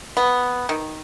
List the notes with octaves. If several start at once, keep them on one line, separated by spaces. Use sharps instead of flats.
B3
D#3